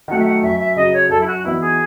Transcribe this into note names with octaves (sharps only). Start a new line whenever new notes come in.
D#3 F#3 A3 F#5
E5
F#5
F#2 E5
E5
C#3 F#3 D#5
C#5
F#2 A4
E4
F#4
E3 B3 D#4 E4 F#4
G#4